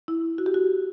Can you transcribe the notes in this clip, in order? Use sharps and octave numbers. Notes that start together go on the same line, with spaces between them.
E4
F#4
G4
F#4